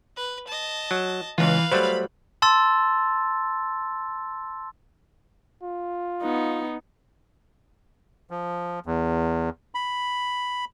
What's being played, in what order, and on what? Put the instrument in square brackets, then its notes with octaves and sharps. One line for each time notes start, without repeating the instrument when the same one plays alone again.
[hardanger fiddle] B4
D#5 A5
[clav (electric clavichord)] F#3
[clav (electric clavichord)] C#2 F4 [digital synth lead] E3 [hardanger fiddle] B4 F5
[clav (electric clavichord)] F#3 G3 A3 [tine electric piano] C5 [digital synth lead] B5
[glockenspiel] A5 C6 E6 A6
[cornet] F4
[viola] B3 D#4
[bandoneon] F3
E2
B5